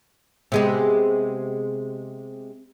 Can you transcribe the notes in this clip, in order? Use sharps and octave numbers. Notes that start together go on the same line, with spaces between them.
C3 G#3 B3